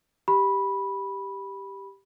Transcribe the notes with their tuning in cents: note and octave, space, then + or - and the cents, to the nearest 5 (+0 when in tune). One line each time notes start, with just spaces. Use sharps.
G4 +0 B5 -10